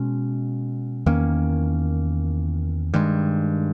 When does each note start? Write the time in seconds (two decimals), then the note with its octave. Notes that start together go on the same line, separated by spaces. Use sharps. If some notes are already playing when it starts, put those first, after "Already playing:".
Already playing: B2 G#3 C#4
1.06 E2 D#3 A#3 C#4
2.94 G2 D#3 G#3